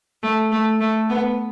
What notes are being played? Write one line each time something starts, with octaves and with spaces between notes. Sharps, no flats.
A3
A3
A3
B3